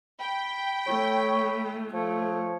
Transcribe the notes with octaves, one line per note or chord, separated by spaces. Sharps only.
G5 B5
A3 C#5
F3 A3 C#5